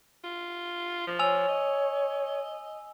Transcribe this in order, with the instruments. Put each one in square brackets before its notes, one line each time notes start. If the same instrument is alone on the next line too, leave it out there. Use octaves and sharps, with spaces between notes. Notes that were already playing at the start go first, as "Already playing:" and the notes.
[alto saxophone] F4
F3
[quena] C#5 [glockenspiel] G#5 E6 F7
[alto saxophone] D#5